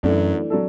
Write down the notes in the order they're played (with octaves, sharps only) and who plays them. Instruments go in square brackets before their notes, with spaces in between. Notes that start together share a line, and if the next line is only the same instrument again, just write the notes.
[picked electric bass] F#2 [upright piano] E3 A3 D4
[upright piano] F#3 D4 A4